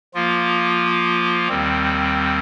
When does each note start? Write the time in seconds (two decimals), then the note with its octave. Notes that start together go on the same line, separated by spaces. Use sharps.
0.15 F3 A#3 F4
1.49 D#2 D#3 G3 C4